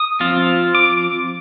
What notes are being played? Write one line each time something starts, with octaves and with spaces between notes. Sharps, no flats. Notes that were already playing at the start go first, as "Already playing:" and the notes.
Already playing: D#6
F3 C4 F4
D6